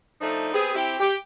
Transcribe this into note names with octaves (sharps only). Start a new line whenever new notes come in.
F3 A3 D4 D#4
B3 C4 G4 G#4
C4 E4 G4
G4